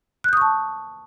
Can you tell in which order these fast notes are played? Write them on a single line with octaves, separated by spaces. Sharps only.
F#6 G6 D#6 C#6 A5